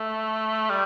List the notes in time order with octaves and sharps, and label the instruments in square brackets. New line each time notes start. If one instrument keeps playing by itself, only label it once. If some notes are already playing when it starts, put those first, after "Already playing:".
Already playing: [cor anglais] A3
G3